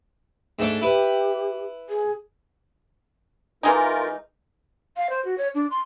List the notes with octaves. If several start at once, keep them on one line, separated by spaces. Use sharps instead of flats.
G#2 A3 D4
E4 G4 B4
G#4
E3 G#3 A3 D#4 F4 A#4
F5
C5
F#4
C#5
D4
C6